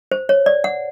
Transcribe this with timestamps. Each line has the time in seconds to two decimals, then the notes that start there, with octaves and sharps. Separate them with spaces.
0.12 C5
0.29 C#5
0.46 D5
0.64 F#5